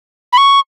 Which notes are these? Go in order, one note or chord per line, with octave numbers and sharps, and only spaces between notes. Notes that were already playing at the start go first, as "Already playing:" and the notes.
B5
C#6